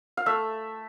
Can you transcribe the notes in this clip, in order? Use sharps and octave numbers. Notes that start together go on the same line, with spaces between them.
F5
A3 E5